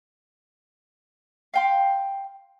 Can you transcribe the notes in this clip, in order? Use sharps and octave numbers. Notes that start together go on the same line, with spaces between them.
F5 G5 C6